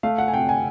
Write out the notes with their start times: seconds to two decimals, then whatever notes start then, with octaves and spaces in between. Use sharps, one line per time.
0.03 A3 F5
0.18 F#5
0.28 G#5
0.33 C3 G5
0.49 G#5